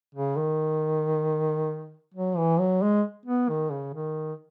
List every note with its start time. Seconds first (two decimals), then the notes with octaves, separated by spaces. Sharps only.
0.15 C#3
0.36 D#3
2.14 F#3
2.37 E3
2.59 F#3
2.82 G#3
3.25 B3
3.49 D#3
3.70 C#3
3.93 D#3